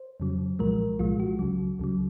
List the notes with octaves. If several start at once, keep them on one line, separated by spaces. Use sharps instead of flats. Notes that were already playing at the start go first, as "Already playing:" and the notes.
Already playing: C5
F2 C#3 F#3
C2 A#2 F3 G#3 A#4
C2 A#2 F3 G#3 F4
F#4
C#2 C#3 F#3
C#2 C#3 F#3